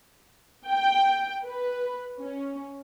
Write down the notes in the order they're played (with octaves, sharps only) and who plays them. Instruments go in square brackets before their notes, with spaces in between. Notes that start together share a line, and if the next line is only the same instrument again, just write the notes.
[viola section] G5
B4
C#4